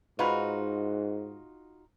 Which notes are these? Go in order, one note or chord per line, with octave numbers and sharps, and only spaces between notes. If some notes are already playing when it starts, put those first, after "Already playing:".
G#2 D#4 F4 F#4 B4 B5